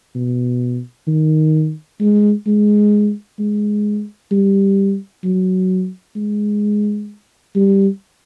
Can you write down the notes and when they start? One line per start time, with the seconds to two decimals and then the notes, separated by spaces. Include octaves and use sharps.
0.15 B2
1.07 D#3
2.00 G#3
2.47 G#3
3.39 G#3
4.31 G3
5.24 F#3
6.16 G#3
7.55 G3